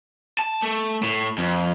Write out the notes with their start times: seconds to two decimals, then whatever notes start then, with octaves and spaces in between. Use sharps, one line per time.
0.39 A5
0.62 A3
1.03 A2
1.38 F2